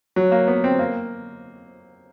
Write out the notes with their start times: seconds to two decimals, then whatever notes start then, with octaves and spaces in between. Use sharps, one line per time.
0.16 F#3
0.32 A#3
0.48 B3
0.64 C4
0.79 A#3